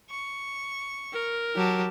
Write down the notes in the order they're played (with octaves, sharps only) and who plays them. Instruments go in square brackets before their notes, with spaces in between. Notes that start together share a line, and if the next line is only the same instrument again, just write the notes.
[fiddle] C#6
[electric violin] A#4
[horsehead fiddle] F#3 [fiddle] G4 A5